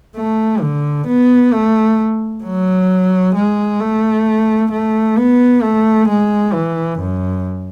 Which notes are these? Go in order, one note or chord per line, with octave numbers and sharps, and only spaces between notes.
A3
D3
B3
A3
F#3
G#3
A3
A3
B3
A3
G#3
E3
F#2